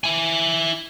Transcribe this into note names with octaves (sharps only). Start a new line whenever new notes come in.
E4 G#5